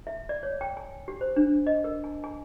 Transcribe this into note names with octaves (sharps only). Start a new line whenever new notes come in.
E5
D5
C#5
G5
G#5
G4
C5
D4
D#5
A#4
G#5
G#5